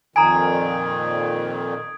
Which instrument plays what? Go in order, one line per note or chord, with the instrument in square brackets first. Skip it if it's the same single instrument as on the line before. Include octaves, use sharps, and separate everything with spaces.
[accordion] F2 A#2 D#3 [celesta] G#5 A#5 [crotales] D#6 G#6 D7